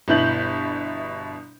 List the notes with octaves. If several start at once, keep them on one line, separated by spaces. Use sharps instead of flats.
G1 B2 E4 G6 F#7